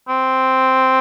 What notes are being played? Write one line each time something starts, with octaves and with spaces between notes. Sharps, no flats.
C4